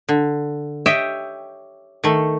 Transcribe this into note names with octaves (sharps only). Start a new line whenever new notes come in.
D3
G4 C#5 D#5 E5 G5
D#3 A3